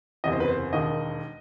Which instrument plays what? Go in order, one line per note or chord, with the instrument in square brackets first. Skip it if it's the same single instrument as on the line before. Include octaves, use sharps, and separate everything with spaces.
[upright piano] F#1 E2 C3 D#5
C5
B4
C5
E1 D#2 D#3 D#5